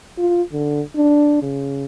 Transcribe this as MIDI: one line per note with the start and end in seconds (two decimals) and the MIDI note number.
0.18 0.42 65
0.52 0.81 50
0.96 1.38 62
1.42 1.85 49